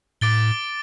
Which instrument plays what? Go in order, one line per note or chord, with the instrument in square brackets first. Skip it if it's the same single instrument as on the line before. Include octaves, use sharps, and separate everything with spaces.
[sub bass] A2 [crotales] D6 A6 D7 G7